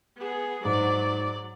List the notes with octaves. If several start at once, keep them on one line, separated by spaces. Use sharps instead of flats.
B3 G#4
G#2 F#3 D5